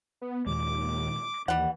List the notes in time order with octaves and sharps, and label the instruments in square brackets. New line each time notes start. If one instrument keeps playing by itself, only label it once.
[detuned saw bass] B3
[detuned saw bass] D#2 [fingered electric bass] A#2 D#3 G#3 [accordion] D6
[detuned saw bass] D#2 [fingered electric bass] E3 [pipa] G3 F#5